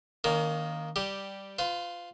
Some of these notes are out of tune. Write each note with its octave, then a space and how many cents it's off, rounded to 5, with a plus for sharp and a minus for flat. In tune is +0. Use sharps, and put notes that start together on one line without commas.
D#3 -5 A#3 +0 C#4 +40
G3 +0 G4 -5
F4 +0 B4 +45